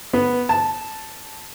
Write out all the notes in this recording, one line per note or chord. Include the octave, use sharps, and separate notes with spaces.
B3
A5